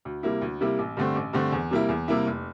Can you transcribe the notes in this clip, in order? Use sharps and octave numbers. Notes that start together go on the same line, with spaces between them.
D2
C3 G3 A#3 E4
D2
C3 G3 A#3 E4
A1
G2 D3 A3 C4
A1
G2 D3 A3 C4
E2
C3 G3 A#3 E4
E2
C3 G3 A#3 E4
F1